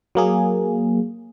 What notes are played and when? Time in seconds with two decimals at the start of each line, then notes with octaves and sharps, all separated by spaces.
0.15 F#3 A#3 G#4